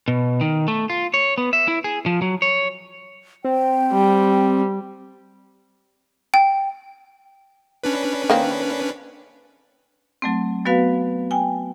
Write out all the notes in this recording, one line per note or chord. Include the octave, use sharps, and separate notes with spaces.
B2
D#3
A3
F4
C#5
B3
E5
E4
G#4
F3
F#3
C#5
C4 G5
G3
G5
C#4 D4 B4
D#3 A#3 C4
F#3 A3 C4
F#3 B3 F#4 B4 F5
G5 G#5